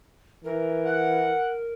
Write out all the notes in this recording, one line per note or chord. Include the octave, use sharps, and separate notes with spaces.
E3 A#4
F#5